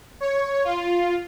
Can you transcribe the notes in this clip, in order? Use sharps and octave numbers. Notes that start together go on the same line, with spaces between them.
C#5
F4